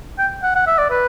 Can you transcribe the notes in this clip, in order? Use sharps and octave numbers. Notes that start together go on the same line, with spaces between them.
G5
F#5
F#5
E5
D5
B4